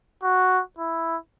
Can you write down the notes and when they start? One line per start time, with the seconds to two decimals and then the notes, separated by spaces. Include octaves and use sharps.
0.24 F#4
0.79 E4